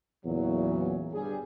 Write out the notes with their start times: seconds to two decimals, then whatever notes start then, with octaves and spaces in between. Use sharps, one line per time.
0.25 E2 A#2 C#3 F#3
1.13 G1 G2 G3 G#4